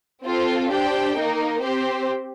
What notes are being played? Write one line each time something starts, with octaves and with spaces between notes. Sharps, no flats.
C4 F4 A4
D4 G4 C5 G5
A#3 D#4 A#4
C4 G4 C5